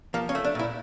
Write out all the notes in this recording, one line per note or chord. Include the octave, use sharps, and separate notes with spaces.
F3 A#3
C#4
A3
D4
A#2 E4